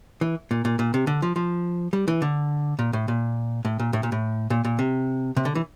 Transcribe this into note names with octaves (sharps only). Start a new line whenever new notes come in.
E3
A#2
A#2
A#2
C3
D3
F3
F3
G3
E3
D3
A#2
A2
A#2
A2
A#2
A2
A#2
A2
A#2
A#2
C3
C3
D3
E3